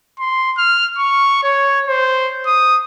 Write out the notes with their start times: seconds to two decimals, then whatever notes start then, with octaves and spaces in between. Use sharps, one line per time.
0.20 C6
0.58 F6
0.98 C#6
1.44 C#5
1.88 C5
2.46 D#6